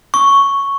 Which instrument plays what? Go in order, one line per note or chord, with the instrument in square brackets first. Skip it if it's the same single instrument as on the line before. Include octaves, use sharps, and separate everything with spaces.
[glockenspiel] C#6